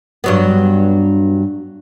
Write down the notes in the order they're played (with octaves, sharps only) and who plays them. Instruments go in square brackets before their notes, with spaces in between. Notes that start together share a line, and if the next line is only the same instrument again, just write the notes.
[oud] G2 F#3 B3